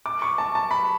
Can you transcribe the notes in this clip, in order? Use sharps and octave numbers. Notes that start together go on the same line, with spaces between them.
D6
C#6
A5
A5
B5